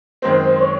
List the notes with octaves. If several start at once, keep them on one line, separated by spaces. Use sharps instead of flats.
F#2 D#3 G#3 C4 C5
C#5